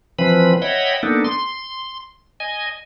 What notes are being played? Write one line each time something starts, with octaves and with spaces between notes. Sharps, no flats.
E3 F3 C4 B4 B5
C#5 D#5 E5 F#5 G5 B5
A#3 B3 D4 D#4 A4
C6
D#5 G#5